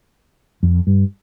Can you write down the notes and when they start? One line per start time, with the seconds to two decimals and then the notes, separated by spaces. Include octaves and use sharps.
0.63 F2
0.87 G2